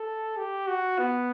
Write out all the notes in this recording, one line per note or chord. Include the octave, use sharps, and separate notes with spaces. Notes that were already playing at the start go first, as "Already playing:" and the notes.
Already playing: A4
G4
F#4
B3